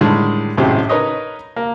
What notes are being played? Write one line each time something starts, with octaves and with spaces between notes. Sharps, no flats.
A2 D3 D#3 G3 G#3
G#1 F#2 A2 C3 G4 G#4
D#4 A#4 B4 C#5 D#5
A#3